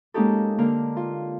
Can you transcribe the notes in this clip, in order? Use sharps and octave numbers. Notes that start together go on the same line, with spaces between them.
G#3 A#3 C#4 D#4 G4 A4
D3 A#3 A#4 F6
F4